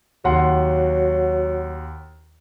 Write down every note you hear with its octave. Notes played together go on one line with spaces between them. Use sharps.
D#2 F#3 F#5 C6